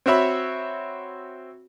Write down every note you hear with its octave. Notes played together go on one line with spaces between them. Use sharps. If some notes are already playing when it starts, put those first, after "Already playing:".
C4 F#4 C#5 E5 B5